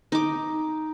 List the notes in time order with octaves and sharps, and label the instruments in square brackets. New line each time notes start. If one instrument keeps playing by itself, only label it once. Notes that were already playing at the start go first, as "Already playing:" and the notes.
[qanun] D#4 D6